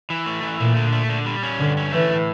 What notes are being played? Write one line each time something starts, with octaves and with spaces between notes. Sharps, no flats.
E3
A3
E3
A#2 A3
D3
A3
D3
G3
C#4
G2 D3
C#4
E3 A3
A2